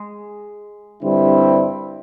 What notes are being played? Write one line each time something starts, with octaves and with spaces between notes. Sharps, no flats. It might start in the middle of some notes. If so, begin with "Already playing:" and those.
Already playing: G#3
G2 D3 G3 C4 E4